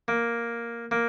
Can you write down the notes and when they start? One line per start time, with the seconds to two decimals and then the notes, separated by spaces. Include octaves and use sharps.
0.08 A#3
0.91 A#3